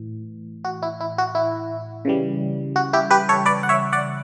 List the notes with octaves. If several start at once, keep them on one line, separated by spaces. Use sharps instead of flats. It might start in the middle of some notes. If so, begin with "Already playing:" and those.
Already playing: A2 E3
F#4
E4
E4
F#4
E4
C#3 E3 G3
F#4
E4 G4
G4 B4
A4 C#5
B4 D5
F#5
C#5 E5
D5 F#5